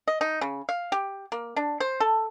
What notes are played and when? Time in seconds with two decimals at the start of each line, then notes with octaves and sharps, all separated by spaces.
0.08 D#5
0.21 D#4
0.41 C#3
0.69 F5
0.92 G4
1.32 A#3
1.56 D4
1.80 C5
2.00 A4